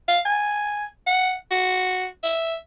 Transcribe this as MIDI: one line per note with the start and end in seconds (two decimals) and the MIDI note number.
0.08 0.20 77
0.25 0.85 80
1.07 1.34 78
1.51 2.07 66
2.24 2.55 76